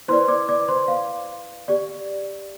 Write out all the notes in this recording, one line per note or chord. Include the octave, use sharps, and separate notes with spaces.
E4 B4 C5 D5 C6
D5 D6
D5 D6
C5 C6
F5
G4 D5